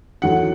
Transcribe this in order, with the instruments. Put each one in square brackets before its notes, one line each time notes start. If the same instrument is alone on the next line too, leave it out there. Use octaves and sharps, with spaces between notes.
[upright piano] E2 D#3 F#3 A3 F#5